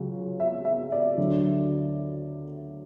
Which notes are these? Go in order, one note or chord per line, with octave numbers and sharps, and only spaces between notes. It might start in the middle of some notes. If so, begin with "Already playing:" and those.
Already playing: C#2 C#3 F#3
E5
E5
D5
D2 D3 F#3